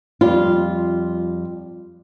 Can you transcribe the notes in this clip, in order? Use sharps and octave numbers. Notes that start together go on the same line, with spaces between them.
F2 G3 F4